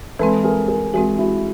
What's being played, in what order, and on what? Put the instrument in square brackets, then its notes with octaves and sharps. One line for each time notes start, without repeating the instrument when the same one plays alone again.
[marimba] E3 G#3 C4 [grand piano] A4 B4
[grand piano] G#4 A#4
G#4 A#4
[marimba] E3 G#3 C4 [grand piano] F#4 G#4
[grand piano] E4 F#4